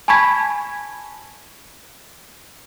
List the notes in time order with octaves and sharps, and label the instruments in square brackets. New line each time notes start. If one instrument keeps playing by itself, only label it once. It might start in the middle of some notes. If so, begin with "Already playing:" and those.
[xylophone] G#5 A5 B5 C#6 G#6 B6